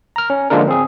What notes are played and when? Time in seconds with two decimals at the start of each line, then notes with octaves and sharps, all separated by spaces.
0.16 A#5 F6
0.30 C#4
0.50 D3 F3 G#3 A#3 D4 A#4
0.68 C4 G#4